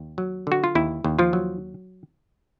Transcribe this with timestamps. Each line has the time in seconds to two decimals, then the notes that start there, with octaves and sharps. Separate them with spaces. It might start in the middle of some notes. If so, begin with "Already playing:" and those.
Already playing: D#2
0.18 F#3
0.47 D3 F#4
0.64 F4
0.75 D#2 E4
1.04 D#2
1.19 F3 F4
1.33 F#3